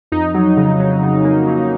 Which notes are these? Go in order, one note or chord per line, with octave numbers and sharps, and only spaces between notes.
F2 D#4
F#3
C#3
F#3
C#3
A#3
F#3